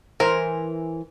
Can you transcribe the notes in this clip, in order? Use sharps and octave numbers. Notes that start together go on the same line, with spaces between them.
E3 A#4 C5